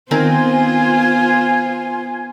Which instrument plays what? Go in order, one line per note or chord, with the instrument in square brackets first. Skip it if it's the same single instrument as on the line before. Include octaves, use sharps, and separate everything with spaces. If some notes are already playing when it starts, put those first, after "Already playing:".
[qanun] D#3 C4 A#4 [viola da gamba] B3 F4 C5 [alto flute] G#5